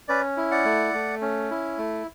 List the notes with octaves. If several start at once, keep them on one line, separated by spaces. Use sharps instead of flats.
C#4 B4 D5
E4
D5 F#5
A3
A3
C#4
E4
A3